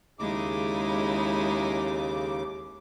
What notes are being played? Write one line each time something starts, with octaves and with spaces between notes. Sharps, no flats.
D#2 C#3 G#3 D#4 E4 D6